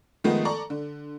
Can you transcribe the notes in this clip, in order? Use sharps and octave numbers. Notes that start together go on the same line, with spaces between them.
D#3 F3 G#3 A3 B3 D#4
A4 D5 A#5 C#6
D3